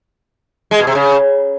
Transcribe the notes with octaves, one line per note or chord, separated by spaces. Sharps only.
G#3
B2
C3
C#3